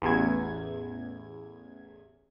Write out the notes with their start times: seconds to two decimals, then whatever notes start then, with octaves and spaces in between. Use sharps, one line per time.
0.02 A1 E2 G#6